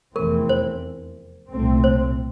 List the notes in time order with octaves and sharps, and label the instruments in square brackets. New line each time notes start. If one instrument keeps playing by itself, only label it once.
[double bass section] F1 E2 E3 A3 C4 [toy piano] A#4
[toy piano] C5
[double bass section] C2 A#2 A3 C4
[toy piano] C5